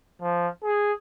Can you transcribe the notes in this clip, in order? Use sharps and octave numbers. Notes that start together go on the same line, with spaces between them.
F3
G#4